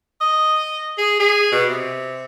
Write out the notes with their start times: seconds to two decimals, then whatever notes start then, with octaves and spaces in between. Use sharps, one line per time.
0.21 D#5
0.98 G#4
1.20 G#4
1.52 B2
1.69 C3